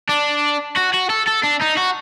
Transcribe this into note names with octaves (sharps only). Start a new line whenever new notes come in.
D4
F#4
F#4
A4
A4
D4
D#4
F#4